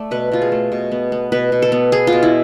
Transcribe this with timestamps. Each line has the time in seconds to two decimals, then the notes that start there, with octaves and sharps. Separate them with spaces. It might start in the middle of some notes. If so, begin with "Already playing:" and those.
Already playing: A3 D5
0.11 B2 B4
0.32 B2 F4
0.42 G#4
0.52 A3
0.72 B2
0.92 B3
1.12 B3
1.32 B2 B4
1.52 B2
1.62 A4
1.72 B3
1.92 B3 G#4
2.07 F4
2.12 B2
2.23 E4